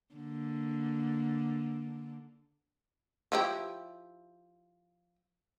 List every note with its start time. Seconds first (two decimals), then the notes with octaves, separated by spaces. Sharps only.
0.15 D3 A#3
3.32 F3 E4 G4